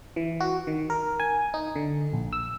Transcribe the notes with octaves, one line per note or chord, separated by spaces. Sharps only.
E3
F#4
D#3
A#4
G#5
D#4
D3
A#1
E6